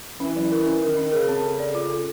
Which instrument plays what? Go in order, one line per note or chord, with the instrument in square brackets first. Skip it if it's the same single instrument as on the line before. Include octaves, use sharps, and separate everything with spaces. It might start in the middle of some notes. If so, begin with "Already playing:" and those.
[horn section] E3 [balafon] C#4
[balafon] F#3
A#4
C#4
[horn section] D#3 [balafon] A#4
[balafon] C#4
[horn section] C#3 [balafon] A#4
[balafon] C4
A4
D5
F4
A4